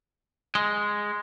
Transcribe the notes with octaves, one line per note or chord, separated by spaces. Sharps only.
G#3